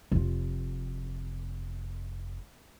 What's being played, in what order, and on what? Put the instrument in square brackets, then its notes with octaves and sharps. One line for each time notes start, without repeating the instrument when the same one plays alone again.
[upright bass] F1 F4